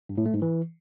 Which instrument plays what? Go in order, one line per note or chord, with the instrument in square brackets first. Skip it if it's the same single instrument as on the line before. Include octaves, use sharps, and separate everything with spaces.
[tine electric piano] G2
A2
A3
G#2
E3